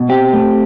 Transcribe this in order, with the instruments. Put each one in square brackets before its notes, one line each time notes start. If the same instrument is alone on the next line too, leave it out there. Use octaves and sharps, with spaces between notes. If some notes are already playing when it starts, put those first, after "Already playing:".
Already playing: [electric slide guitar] B2
C4 G4
A3